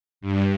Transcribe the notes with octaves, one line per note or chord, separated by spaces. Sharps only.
G2